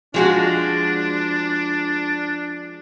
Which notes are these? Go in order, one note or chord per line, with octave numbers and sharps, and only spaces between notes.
F3 G#3 D4 F#4